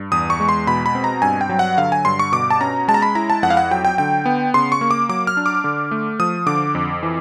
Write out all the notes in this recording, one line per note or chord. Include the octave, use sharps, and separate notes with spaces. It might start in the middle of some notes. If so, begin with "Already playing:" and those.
Already playing: G2
E2 D#6
C#6
G#3
C6
B2 B5
B5
C4
A#5
G2 G#5
G5
F#3
F#5
D3 F5
G#5
G2 C6
C#6
B2 D6
A5
C#4 A#5
G#3 A5
A#5
B5
E4 A#5
A5
F2 F#5
F5
F#5
F#3 G5
G5
D3 G5
B3
C#3 C6
C#6
A#3
D6
F#3 D6
F6
D4
D6
D3
A3
F3 D#6
D3 D6
F2
E3